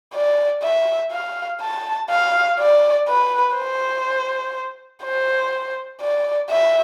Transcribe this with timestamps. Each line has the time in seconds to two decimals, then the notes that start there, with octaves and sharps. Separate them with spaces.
0.14 D5
0.63 E5
1.12 F5
1.61 A5
2.10 F5
2.60 D5
3.08 B4
3.56 C5
5.04 C5
6.01 D5
6.50 E5